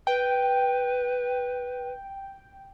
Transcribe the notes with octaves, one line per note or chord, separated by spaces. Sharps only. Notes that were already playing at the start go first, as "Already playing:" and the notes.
B4 G5